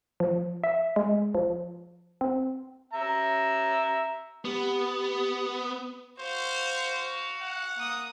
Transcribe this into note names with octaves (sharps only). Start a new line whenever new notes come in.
F3
E5
G#3
F3
C4
E5 A#5
B3 G4
F#4 C5 F5
F#5
A#3 D#6